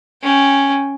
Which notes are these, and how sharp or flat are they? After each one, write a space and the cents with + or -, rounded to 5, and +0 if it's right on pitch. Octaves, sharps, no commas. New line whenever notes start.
C#4 +0 G5 +0